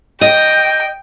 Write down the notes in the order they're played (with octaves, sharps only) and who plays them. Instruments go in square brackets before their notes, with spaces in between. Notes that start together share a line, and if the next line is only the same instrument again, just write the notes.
[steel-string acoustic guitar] D#5 [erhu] G5